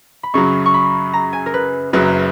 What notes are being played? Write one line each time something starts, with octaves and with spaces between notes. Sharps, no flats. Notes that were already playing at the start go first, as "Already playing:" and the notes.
B5
F#2 C#3 F#3 C#6
C#6
B5
A#5
G#5
A#4
B4
F#1 F#2 C#3 F#3 B4